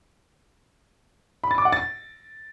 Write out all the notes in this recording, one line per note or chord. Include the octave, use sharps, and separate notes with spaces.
B5
A6
D6
F#5
A6